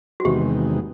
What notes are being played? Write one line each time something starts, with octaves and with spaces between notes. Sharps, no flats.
F#4
E2 C3 D#3 G#3 B3 G4